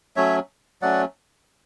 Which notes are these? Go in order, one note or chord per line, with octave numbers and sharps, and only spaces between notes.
F#3 A3 C#4 C#5 E5
F#3 A3 C#4 D5 F#5